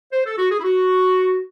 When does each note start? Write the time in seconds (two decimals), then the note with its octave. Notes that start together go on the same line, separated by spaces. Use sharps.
0.13 C5
0.26 A4
0.38 F#4
0.52 G#4
0.60 E4
0.64 F#4